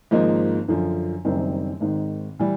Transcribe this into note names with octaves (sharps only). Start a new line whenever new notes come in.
G#1 G#2 F3 A#3 D#4
F#2 D3 F3
F#1 F#2 D#3 G3 C4
G#1 G#2 D#3
E3 G3